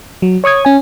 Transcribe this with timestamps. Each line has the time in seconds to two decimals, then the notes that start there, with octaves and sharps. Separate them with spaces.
0.22 F#3
0.44 C#5 C#6 D#6 G#6
0.65 C#4 G#5